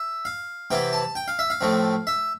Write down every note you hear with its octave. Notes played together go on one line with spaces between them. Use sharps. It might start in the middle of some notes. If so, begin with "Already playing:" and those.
Already playing: E5
F5
C3 E3 B3 E4 G5
A5
G5
F5
E5
F5
A2 F3 A3 C4
E5